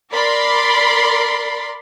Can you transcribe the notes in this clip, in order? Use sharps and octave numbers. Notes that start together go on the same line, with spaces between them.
A#4 D5 B5 C6